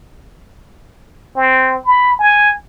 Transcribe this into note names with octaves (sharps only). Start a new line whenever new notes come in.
C4
B5
G#5